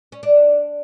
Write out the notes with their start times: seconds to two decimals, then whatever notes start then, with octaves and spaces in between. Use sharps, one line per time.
0.12 C#4
0.23 D4